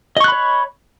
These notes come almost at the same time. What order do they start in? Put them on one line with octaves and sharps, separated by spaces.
D#5 C#6 F#6 B5 C#5